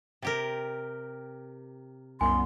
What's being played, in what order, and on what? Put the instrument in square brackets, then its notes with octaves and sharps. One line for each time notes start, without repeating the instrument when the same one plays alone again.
[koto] C3 G4 A#4
[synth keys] C2 F#2 B3 [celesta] G#5 [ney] C6